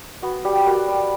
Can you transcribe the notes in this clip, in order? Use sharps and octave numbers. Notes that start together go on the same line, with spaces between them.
B3 F#4
G3 G4
G3 F#4 A#4
G3